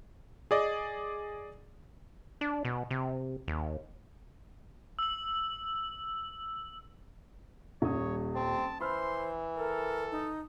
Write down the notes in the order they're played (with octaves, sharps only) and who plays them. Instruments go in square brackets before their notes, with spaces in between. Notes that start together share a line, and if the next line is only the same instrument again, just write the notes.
[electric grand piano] G#4 D5 D#5
[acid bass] D4
B2
C3
D#2
[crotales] E6 F#7
[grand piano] D#1 G3 D#6 [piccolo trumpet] C#5
[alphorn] C4 [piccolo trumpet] A5
[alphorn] E3 [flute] C5 [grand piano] B5 E6 F6 [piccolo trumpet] C6
[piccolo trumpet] A4 [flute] A#4
[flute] D#4